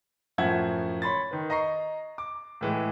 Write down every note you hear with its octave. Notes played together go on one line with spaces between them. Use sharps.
F#2 A2 F3 E5 F#5 G#6
C#5 B5 C6 A6
D#3 B4
D#5 A#5 C#6 C7
D6
A2 E3 G#3